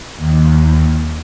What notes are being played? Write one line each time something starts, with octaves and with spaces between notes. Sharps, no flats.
D#2